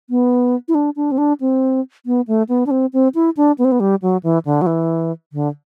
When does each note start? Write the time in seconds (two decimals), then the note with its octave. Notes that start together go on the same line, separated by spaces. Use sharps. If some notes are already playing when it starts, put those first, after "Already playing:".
0.10 B3
0.68 E4
0.75 D4
0.96 D4
1.12 C4
1.18 D4
1.40 C4
2.06 B3
2.28 A3
2.49 B3
2.66 D4
2.71 C4
2.93 C4
3.15 E4
3.37 D4
3.58 B3
3.65 C4
3.72 B3
3.80 G3
4.02 F#3
4.23 E3
4.45 D3
4.62 F#3
4.66 E3
5.33 D3